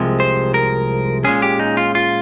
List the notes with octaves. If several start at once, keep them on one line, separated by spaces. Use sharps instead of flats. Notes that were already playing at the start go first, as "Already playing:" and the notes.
Already playing: C2 C3 F3 G#3
C5
A#4
A#2 G#3 C#4 G#4
G4
D#4
F4
F4